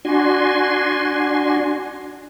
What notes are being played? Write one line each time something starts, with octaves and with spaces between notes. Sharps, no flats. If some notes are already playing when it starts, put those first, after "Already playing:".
D4 F#4 G#5 C6